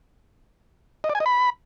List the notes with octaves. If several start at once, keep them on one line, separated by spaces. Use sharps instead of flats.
D#5
D5
G#5
D#5
B5